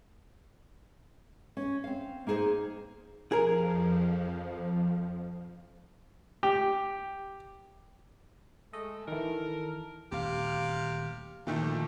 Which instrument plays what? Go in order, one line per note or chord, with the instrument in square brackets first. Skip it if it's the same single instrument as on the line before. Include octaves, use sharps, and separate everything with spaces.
[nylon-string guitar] C#4
C4 F5
A#3 D#4 G#4 C5
[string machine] F2 F3 [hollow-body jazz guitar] G#4 A#4
[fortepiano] G4
[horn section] G#3 A3 [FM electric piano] D#5
[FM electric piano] D#3 E3 [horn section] A4 A#4
[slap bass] D#1 D2 A3 [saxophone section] C3 G4 F5
[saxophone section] D2 A3 [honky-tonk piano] A#2 D#3 [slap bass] E3
[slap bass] D3 F3